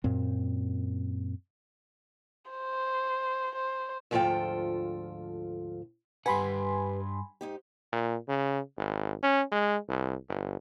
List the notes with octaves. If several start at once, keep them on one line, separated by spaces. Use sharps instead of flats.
F#2 A#2 C4
C5
C5
D2 G#2 F3 F4 A4 G5
G2 G4 B4 F#5 G#5 B5 C6
G#2 D#4 G4
A#2
C#3
G#1
C#4
G#3
C2
G1